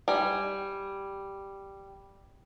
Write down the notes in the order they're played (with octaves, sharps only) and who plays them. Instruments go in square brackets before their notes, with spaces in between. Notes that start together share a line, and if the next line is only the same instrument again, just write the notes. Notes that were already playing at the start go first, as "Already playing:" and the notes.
[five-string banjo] G3 G#5